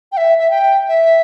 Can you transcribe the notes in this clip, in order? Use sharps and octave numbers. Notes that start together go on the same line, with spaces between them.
G5
E5
E5
G5
E5